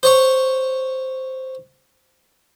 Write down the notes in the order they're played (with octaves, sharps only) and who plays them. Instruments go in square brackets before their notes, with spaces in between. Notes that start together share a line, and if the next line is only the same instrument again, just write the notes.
[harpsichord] C5 C#5 C#6